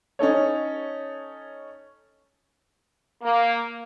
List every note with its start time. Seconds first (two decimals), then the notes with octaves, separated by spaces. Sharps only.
0.19 C#4 D#4 A4 C#5
3.23 A#3